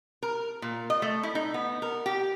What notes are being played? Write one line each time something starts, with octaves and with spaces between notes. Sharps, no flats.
A#4
A#2
D#5
A3
E4
D#4
B3
A#4
G4